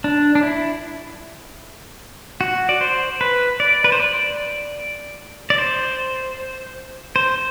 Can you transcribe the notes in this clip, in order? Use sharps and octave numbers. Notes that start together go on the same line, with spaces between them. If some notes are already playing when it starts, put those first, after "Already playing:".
D4
D4
E4
F#4
D5
C5
B4
D5
B4
C5
D5
D5
C5
C5